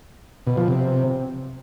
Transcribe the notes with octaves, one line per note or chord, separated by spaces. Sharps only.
B2
F3
C3